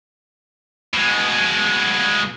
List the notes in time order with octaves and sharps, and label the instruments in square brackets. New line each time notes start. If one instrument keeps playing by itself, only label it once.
[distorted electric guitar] B2 G#3